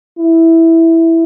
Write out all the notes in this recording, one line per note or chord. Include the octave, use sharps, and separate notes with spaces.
E4